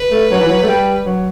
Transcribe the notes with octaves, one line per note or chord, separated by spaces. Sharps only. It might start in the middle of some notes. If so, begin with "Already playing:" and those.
Already playing: B4
A3
F#3
E3
F#3
A3
G3
F#3